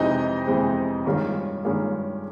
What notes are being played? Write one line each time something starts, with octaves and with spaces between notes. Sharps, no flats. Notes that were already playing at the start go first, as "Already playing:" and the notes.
Already playing: F2 C3 E3 G#3 C4 D#4 D#5
F2 C3 E3 G#3 C4
G2 D#3 G#3 C#4 F4
G2 D#3 G#3 C#4 F4